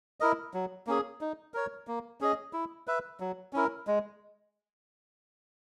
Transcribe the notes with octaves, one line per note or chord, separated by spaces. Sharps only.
E4 A#4 D#5
F#3
A#3 C#4 G#4
D#4
A#4 C#5
A#3
C#4 G#4 D#5
E4
B4 E5
F#3
C#4 E4 A#4
G#3